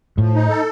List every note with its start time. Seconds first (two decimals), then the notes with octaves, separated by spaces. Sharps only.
0.18 A2 F3
0.34 D#4
0.49 A4